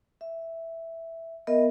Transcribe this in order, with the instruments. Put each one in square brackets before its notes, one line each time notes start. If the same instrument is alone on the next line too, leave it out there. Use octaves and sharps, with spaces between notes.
[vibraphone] E5
B3 A#4 D#5 E5